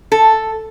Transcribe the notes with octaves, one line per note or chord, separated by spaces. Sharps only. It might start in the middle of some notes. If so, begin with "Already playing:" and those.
A4